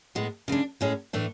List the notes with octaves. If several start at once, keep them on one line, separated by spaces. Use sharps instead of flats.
A2 G#3 B3
C#3 G#3 D4
A2 G#3 C#4 G#4
A2 E3 A3 D4